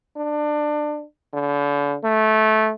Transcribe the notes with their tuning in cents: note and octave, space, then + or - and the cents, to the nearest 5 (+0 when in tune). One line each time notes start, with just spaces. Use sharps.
D4 +25
D3 -35
A3 -15